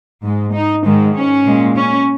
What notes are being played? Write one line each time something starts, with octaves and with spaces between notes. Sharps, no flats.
G#2 G#3
D#4
G#2 D#3 G#3
C#4
A#2 G#3
C#4